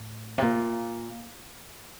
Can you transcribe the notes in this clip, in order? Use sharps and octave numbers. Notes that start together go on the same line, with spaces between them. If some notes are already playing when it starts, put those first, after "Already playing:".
Already playing: A2
C3
A#2